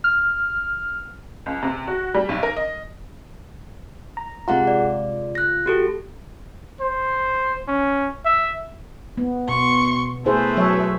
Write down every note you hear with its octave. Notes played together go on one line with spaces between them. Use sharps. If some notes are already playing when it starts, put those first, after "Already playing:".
F6
C#2
C3
F#4
G3
B1
A#4
D#5
A#5
C3 G#3 F4 G#4 F#5 A#5
D5
F#6 A#6
F#4 G4 A4
C5
C#4
E5
B3
B2 C6 C#6
A3 E4 G#4 B4 C5
F#3 C#5 E5